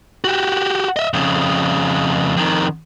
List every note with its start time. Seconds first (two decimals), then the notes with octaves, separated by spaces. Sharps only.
0.24 F#4 G4
0.96 D#5 E5
1.14 F2 C#3
2.37 F2 D#3